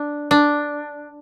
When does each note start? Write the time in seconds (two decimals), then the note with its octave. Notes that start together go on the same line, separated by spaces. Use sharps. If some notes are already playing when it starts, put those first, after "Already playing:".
Already playing: D4
0.31 D4